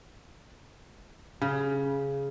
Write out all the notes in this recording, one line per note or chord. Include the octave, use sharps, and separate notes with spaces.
C#3